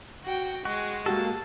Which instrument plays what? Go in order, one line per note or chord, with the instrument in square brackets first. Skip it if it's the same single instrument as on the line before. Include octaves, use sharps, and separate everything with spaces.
[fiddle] F#4 G5
[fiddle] G#3 [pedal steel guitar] F#4
[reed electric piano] G#3 F#4 G4 [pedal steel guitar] A#3 A4 [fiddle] A5